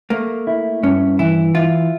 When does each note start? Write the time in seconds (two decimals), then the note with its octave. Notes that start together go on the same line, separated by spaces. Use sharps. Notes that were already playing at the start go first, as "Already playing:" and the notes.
0.10 A3 A#3
0.47 E4
0.83 G2 C#4
1.19 E3 E4
1.55 E4 F4